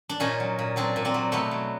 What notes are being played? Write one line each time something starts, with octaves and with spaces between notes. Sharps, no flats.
D4
A#2 C#4 D#4
F#3
A#2
F#3 C4 D4
A#2
A#3 C4
F#3
B2 A3 B3
F#3